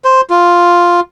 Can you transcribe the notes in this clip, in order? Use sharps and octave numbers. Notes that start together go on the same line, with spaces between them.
C5
F4